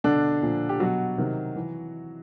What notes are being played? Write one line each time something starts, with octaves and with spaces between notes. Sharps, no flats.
B2 D3 D4
A#2 F3
G4
B2 F#3 F#4
C3 D#3
E3